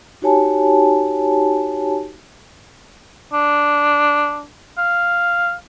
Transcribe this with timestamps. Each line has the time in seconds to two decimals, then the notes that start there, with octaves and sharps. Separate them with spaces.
0.22 D#4 F#4 G4 C#5 G#5 A5
3.33 D4
4.78 F5